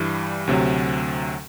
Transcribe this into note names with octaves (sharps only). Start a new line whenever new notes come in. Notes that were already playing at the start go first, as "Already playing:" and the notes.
Already playing: G2 E3 G3
D2 C3 F#3